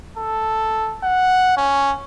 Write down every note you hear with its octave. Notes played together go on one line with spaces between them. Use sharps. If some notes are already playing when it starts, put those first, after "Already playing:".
A4
F#5
C#4